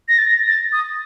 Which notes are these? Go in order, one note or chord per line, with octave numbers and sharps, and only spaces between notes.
A#6
A6
A#6
A6
D#6